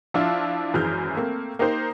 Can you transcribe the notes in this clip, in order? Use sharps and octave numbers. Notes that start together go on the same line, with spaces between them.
F3 D4 E4 F4 E6
G#1 F#2 E3 G#4 F6 G6
A3 A#3 C4
A#3 D#4 G4 A#4 C5